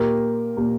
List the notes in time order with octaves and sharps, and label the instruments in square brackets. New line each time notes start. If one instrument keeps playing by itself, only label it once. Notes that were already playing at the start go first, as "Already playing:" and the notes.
Already playing: [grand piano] A#2 A#3 G4 [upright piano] A#4
[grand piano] A#2 A#3 G4